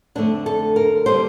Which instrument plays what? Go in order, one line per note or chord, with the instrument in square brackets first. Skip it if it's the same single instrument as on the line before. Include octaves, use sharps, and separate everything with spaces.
[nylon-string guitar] F2 D3 A3 D4
A4
A#4
D3 G3 A#3 C5